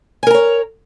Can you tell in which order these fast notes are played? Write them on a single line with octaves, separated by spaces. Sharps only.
G#5 A#4 A#5 C#5